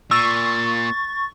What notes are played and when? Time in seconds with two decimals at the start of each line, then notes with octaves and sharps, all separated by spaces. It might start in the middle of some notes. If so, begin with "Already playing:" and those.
0.11 A#2 C#6 E6 A6